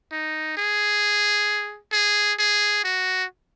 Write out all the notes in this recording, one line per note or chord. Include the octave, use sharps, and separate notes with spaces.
D#4
G#4
G#4
G#4
F#4